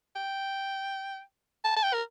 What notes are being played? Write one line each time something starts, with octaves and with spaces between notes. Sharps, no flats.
G5
A5
A5
G5
A#4